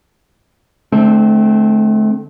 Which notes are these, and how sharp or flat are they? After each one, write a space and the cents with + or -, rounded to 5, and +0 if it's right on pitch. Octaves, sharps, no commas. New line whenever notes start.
D3 +10 A3 -35 C4 +0